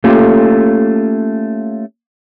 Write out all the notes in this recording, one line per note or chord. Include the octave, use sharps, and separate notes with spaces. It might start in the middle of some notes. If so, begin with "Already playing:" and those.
A3 A#3 C#4 F4 G4 A4